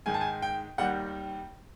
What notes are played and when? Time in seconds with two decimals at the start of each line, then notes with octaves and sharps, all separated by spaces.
0.06 G#2 D#3 G#3 G#5
0.14 A5
0.21 G#5
0.42 G5
0.78 D#2 D#3 G3 F#5